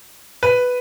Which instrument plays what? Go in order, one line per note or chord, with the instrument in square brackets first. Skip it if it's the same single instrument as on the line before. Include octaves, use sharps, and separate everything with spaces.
[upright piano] B4